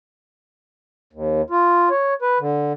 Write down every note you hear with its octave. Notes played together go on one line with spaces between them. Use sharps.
D#2
F4
C#5
B4
D3